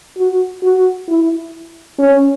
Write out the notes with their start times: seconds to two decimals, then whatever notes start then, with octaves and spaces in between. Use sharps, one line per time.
0.17 F#4
0.62 F#4
1.08 E4
1.98 C#4